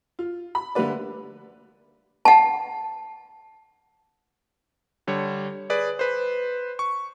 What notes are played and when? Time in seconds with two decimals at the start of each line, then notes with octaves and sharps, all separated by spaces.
0.19 F4
0.55 B5
0.75 D3 G3 A3 A#3 B4 D5
2.25 F#5 A5
5.07 D3 G3 C#5
5.70 G#4 B4 D5
5.99 B4 C5
6.79 C#6